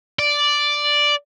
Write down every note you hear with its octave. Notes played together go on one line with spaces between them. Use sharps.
D5